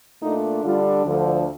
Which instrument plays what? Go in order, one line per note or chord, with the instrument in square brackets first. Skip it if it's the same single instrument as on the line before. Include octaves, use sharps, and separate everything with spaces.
[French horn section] A#2 A3 D4 D#4
D3 G3 D4 F4
D2 D3 F3